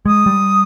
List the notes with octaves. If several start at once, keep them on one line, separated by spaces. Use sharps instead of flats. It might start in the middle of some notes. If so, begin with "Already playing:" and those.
G#3 D#6
G3